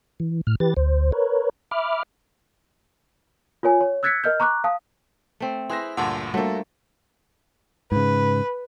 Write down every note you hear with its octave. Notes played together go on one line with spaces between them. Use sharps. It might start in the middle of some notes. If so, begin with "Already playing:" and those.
E3
A2 F6
E3 G4 B4 A6
D2 C5
A#4 B4 C#5
E5 B5 D6 F6
F4 A#4 C#5 G#5
C#5
E6 F#6 G#6 A6 B6 C#7
A#4 D#5 F6 G6
A#5 C#6 D6 F#6
F5 A5 D#6
A3 C4
E4 G#4 B4 C5 E5 C6 A#6
D2 G2 A#2 F#5 A5 C6
G3 A3 A#3 D4 F#4 A4
G#2 C#3 B4